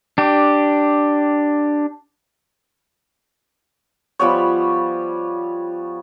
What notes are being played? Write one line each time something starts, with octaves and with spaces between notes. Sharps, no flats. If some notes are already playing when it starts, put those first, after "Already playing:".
D4 G4
F3 G3 B3 C#5